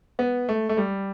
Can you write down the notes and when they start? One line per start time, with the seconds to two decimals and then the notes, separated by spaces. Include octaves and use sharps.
0.19 B3
0.49 A3
0.69 A3
0.77 G3